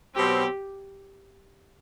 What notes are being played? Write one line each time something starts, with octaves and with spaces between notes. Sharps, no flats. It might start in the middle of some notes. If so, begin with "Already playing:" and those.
B2 F#3 C4 G4